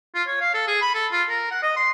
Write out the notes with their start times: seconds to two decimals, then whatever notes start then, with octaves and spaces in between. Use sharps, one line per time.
0.15 F4
0.27 C#5
0.41 F5
0.54 A4
0.67 G#4
0.82 B5
0.94 A4
1.12 F4
1.29 A#4
1.51 F#5
1.63 D#5
1.76 C6